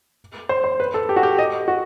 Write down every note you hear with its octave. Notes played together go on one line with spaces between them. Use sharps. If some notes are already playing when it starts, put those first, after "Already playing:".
C5
C5
B4
A4
G4
F#4
G4
D#5
F#4